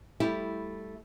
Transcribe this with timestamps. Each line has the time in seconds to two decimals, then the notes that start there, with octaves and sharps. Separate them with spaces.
0.20 G3 A3 E4 G4